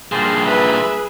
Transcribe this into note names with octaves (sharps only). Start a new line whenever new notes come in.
G2 A#2 G#4 C5
B4 E5